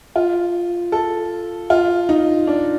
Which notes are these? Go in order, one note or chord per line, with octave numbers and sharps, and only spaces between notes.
F4
A4
F4
D#4
D4